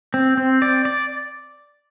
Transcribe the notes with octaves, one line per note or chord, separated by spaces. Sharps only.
C4
C4
D5
D5